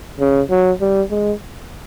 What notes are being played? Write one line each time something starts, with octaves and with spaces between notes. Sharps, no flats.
C#3
F#3
G3
G#3